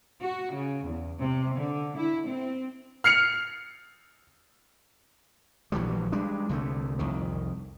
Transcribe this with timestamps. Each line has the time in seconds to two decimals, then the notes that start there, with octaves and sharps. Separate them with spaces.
0.21 F#4
0.53 C#3
0.86 E2
1.20 C3
1.55 D3
1.98 E4
2.26 C4
3.04 F6 C7 C#7 F7
5.72 A#1 E3 F#3 G3
6.12 G3 G#3 D4
6.49 C2 D3 G3 A3
6.99 C2 F2 D#3